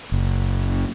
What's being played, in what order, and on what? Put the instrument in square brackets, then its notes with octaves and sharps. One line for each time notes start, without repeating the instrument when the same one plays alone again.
[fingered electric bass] F#1